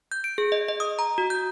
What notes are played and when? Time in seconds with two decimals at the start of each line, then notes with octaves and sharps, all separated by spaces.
0.12 G6
0.24 D7
0.38 G#4
0.52 D#5
0.68 D#5
0.80 D#6
0.99 A#5
1.18 F#4
1.30 G6